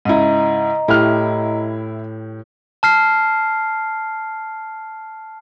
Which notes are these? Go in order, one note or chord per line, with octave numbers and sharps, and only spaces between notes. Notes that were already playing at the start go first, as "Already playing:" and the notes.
G#2 C#3 E4 D#5 A#5
A2 E4 G4 F6
A5 F6 C7